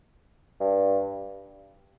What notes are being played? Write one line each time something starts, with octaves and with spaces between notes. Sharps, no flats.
G2